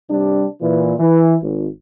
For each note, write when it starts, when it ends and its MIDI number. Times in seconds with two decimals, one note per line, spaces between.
0.10 0.47 48
0.10 0.47 55
0.10 0.47 62
0.61 0.93 46
0.61 0.93 52
0.99 1.36 52
1.41 1.67 32